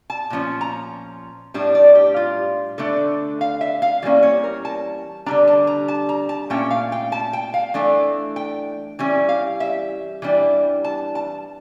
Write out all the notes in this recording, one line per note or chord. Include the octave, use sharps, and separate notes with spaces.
A5
A#2 F3 C#4
A#5
A2 G3 D4 A5
D5
G4
F4
D3 A3 D4 A4
F5
E5
F5
E3 G3 A#3 C#4 D5
C#5
A#4
A5
D3 G3 D4 A#5
A5
A#5
A5
A#5
A5
A#2 A3 C#4 G5
F5
G5
A5
G5
F5
E3 A3 D4
G5
E3 G3 C#4
F5
E5
E3 G3 D4
A5
A5